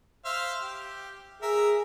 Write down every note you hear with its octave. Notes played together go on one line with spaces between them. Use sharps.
C5 E5 F5
G4
G#4 A#4 E5